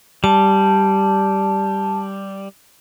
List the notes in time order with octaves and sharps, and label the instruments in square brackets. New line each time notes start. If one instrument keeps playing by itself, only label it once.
[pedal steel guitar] G3 [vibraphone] A5